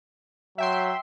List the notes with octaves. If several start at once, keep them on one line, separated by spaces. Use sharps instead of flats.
F#3 E5 G5 C6